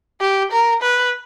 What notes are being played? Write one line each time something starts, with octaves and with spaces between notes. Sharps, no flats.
G4
A#4
B4